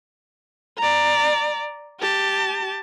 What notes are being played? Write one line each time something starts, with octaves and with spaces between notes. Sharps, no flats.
D5 A#5
G4 A5